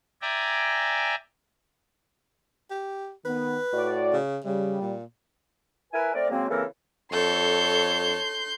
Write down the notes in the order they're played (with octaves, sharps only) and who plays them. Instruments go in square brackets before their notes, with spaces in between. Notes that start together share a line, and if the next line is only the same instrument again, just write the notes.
[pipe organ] D5 E5 G5 G#5 A#5
[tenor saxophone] G4
[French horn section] D#3 B3 [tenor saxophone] B4
[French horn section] A2 F#4 D5
[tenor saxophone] C#3
[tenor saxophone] C#3 [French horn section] G3
[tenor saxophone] A#2
[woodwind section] E4 A#4 B4 G#5
A3 C4 A#4 D5
C#3 F#3 G#3 A#3 C4
C#3 E3 A#3 C4 A4 A#4
[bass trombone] F2 [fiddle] A4 C#5 [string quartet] C6 G6